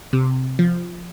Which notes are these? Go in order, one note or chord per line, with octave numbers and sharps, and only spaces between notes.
C3
F3